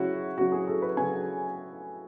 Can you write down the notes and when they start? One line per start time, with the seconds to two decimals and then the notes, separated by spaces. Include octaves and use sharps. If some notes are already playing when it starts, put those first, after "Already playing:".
Already playing: C#3 F#3 C#4 E4 F#4
0.37 C#3 F#3 C#4 F#4
0.52 G#4
0.67 A4
0.82 B4
0.97 C#3 F#3 C#4 G#5